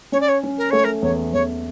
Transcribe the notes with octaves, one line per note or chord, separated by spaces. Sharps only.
C#4 C#5
D5
C#5
C#4
A#4
A3 C#5
A#4
E2 C#5
E2 C#5